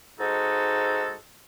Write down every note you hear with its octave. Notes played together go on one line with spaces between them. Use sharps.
G#2 G#3 D#4 F#4 A4